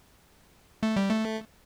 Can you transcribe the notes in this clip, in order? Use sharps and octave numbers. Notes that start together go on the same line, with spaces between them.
A3
G3
A3